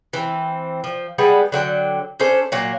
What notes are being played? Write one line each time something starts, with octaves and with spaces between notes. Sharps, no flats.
E3 C4
F3
G3 G#3 B3 F#5
D3 F#3 G5
C#4 D4 A4 C5
A#2 F#3 A#3